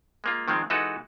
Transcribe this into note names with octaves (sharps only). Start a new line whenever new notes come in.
G#3 A#3 F4
D#3 F3 G#3 C4
E3 G#3 D#4 F#4 A4 B4